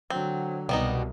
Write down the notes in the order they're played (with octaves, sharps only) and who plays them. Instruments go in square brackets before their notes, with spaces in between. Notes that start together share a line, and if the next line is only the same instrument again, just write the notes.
[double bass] D3 F#3 [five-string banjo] C4
[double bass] C2 [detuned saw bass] B2 [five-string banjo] G3 B3 D#4